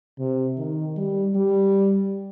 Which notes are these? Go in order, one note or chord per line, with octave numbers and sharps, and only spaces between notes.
C3
D#3
G3
G3